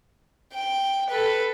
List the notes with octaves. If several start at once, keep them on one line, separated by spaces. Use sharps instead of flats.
G5
A4 B4